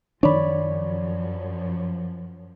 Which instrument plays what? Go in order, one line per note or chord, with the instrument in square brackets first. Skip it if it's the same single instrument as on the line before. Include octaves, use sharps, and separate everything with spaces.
[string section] F#2 F3 [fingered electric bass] D#3 D4 [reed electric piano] C#5 D5 B5